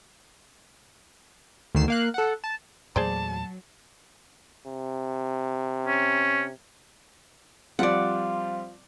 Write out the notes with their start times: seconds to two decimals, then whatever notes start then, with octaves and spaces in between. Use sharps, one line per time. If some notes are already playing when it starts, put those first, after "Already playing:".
1.75 D2 D#3 C7 E7
1.88 A#3 F5 F#6
2.14 A4 F#5
2.44 A5
2.96 E2 A#2 F#3 A3 G#4 C5 D5 A5
4.66 C3
5.87 C#4
7.79 F3 G3 C4 F4 D5 F#5